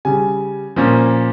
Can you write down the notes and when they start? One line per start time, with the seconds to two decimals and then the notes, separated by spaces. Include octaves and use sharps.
0.05 C#3 G3 C#4 G#5
0.76 A#2 F3 A#3 C#4